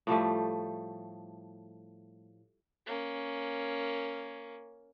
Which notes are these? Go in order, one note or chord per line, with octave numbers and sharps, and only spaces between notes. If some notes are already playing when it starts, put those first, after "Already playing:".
A2 F3 G3 A3
A#3 C#4